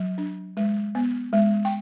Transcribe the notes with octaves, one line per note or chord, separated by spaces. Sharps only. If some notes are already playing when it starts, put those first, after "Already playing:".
Already playing: F#3
D4
G#3
B3
G#3
G5